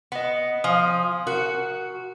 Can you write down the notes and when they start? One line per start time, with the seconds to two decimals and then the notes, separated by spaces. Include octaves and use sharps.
0.12 B3 D#5 F#5
0.64 F3 G#5 C6 D#6
1.27 F#4 A#4